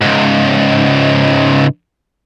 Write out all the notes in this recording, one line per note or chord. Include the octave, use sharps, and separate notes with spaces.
C#2 G#2